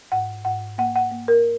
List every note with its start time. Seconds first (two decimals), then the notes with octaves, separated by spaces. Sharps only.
0.12 G#2 F#5
0.45 G#2 F#5
0.78 A#3 F#5
0.96 F#5
1.11 A#3
1.28 A#4